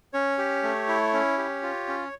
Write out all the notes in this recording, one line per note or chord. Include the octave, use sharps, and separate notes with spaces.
C#4 C#5
G4
A3
E4
C#4
G4
F4
C#4